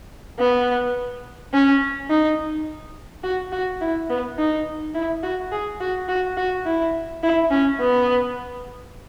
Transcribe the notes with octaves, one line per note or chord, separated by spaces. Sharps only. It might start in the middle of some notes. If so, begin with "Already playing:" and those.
B3
C#4
D#4
F#4
F#4
E4
B3
D#4
E4
F#4
G#4
F#4
F#4
F#4
E4
E4
C#4
B3